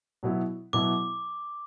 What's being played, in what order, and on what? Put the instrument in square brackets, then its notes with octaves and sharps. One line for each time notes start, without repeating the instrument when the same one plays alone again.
[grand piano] B2 F#3 B3 E4
[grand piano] B2 F#3 B3 E4 [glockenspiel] D6